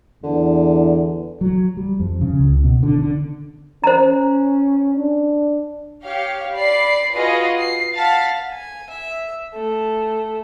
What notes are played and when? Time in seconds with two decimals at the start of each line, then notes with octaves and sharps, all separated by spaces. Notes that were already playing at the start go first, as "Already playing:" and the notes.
0.23 E2 D3
1.41 F#3
1.77 G3
2.00 F2
2.21 C#3
2.40 C#2
2.64 B2
2.83 D3
2.99 D3
3.84 C#4 C5 A#5
4.97 D4
6.03 G4 C#5 F5
6.54 D5 B5 C7
7.15 F4 F#4 G#4 B4 D#5 F5
7.58 C7
7.94 F5 F#5 A5 A6 B6
8.50 G#5
8.89 E5
9.53 A3